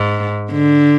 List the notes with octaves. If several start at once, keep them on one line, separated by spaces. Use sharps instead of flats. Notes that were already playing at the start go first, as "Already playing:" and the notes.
Already playing: G#2
D3